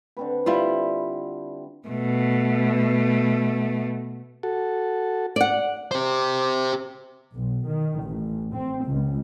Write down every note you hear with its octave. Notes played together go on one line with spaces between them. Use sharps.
D3 C4 B4
G3 E4 F4
B2 A3
F#4 A4
D5 F#5
G4 C5
B1
D#3
A1
C4
C#2